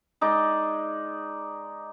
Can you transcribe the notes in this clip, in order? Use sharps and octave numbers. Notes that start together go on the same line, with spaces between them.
G#3 D#4 D5